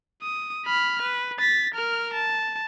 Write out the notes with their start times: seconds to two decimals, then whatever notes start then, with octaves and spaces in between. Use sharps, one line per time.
0.22 D#6
0.66 B5 F6
1.02 B4
1.39 A6 B6
1.75 A#4 F6
2.14 A5